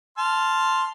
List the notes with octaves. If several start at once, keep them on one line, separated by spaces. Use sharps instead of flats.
A5 C6 F6